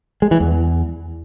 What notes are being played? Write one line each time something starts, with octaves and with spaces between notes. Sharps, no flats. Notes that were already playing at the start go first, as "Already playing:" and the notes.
G#3
E3
E2